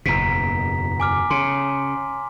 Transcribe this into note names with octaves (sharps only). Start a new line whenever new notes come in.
F#1 E2 B2 A#5 B6
G#5 D6 F6
C#3 C6